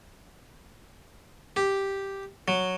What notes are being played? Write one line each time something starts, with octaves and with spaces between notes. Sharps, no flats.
G4
F#3